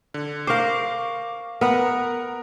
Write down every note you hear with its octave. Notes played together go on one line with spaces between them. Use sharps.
D3
A#4 C5 F5 C#6 D6
B3 A#4 F#5